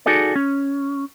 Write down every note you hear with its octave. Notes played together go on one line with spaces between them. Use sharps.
D#4 F#4 G#4 A4 D5
C#4